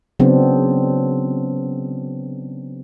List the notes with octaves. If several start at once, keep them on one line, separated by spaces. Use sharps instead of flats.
C#3 F#3 B3 C4 D4